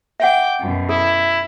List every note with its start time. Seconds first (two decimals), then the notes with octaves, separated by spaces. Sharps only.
0.20 E5 F#5 G5 D6
0.60 F#2 B2
0.89 E4 A4